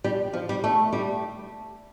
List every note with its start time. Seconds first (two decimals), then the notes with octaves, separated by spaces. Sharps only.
0.04 G3
0.33 F3
0.49 G3
0.64 A3
0.93 G3